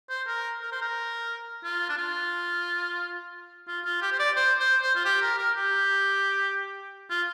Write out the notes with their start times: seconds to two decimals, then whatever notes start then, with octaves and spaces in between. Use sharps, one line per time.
0.09 C5
0.27 A#4
0.61 A#4
0.72 C5
0.82 A#4
1.64 F4
1.89 D4
1.97 F4
3.68 F4
3.85 F4
4.02 G4
4.12 C5
4.19 D5
4.36 C5
4.60 C5
4.82 C5
4.95 F4
5.05 G4
5.21 A#4
5.38 A#4
5.56 G4
7.10 F4